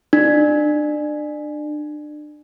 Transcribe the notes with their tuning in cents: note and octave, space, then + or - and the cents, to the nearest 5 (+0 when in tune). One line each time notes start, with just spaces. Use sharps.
D4 +30